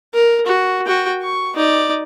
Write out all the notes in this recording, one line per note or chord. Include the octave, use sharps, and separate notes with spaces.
A#4
F#4
F#4 G5
C#6
D#4 D5